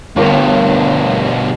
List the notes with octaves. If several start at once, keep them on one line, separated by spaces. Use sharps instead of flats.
G1 G2 B2 A#4